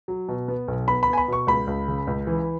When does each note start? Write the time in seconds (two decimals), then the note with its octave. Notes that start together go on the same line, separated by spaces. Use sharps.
0.08 F#3
0.28 B2
0.48 B3
0.68 B1
0.88 B3 B5
1.03 B5
1.08 B3
1.13 G#5
1.18 B5
1.28 B2 C#6
1.47 C#2 B5
1.67 C#2
1.88 C#3
2.07 C#2
2.27 E3